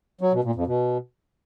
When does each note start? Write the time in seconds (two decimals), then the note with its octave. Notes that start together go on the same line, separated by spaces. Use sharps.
0.21 F#3
0.33 B2
0.44 A#2
0.55 F2
0.67 B2